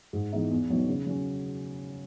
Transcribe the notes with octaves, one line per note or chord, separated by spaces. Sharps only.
G#2
E3 G#3 B3 D#4
E2
B2 F#3 B3 D#4
C#3
F#3 C#4